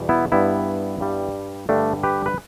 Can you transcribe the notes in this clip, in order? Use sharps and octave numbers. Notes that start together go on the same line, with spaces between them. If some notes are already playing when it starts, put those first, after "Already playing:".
Already playing: E2 B2 G3
B3 E4
G2 G3 B3 E4
G2 G3
G2 D3 G3 A3 D4
G4 B4
B4